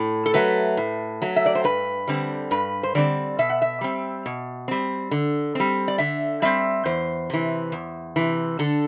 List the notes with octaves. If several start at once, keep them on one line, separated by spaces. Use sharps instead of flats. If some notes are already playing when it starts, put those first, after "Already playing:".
Already playing: A2
A4
F#3 A3 B4
A2
F#3 A3
E5
D5
C5
G2 B4
D3 G3 C4
G2 B4
C5
D3 G3 C4 D5
B2 E5
F#5
E5
G3 C4
B2
G3 C4
D3
G3 C4
D5
D3 E5
G3 C4 E5
E2 C5
C3 E3
E2
C3 E3
D3 A4